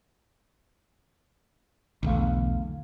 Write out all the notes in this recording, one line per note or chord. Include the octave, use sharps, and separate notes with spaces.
B1 E2 D3 A3 F5